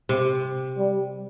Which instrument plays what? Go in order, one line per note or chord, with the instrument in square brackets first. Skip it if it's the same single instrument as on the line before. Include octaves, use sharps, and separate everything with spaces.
[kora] C3
[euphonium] G3